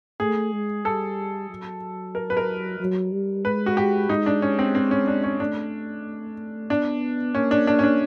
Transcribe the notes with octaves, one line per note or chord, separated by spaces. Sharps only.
A3 G#4
G#3
G3 A4
F#3
A#4
B4
A#4
F#3
G3
G#3 B4
F#4
G4
G#3 D#4
D4
C#4
C4
C4
C#4
D4
C#4
A3 D4
B3 D4
A#3 C#4
D4
D4
C#4
D4